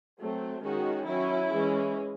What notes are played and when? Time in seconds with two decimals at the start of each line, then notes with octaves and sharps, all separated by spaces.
0.19 F#3 A3 C4
0.63 D#3 G#3 C#4 F#4
1.07 F#3 C#4 E4
1.51 E3 G#3 C#4